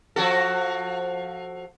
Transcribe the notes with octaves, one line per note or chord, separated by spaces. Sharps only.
F3 F#4 A4